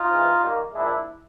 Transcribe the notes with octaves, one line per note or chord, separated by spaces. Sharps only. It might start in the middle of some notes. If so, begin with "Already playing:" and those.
Already playing: D#4 F4
E3 G#3 C4
D#3 G3 A#3
A#2 F3 G#3 D4 E4